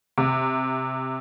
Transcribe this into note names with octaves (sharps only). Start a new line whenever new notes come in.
C3